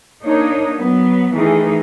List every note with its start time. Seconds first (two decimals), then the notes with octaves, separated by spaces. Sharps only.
0.23 A#3 D4 D#4 C#5
0.76 F#3 B3
1.34 D#3 E3 A3 D#4 G#4